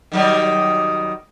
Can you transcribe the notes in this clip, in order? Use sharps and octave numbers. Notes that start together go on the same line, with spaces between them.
D#3 F#3 G3